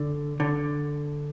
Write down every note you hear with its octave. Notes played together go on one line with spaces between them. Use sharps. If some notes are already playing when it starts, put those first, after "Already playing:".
Already playing: D3
D3